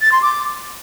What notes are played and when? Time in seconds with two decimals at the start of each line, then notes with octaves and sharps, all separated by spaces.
0.01 A6
0.12 C6
0.22 D6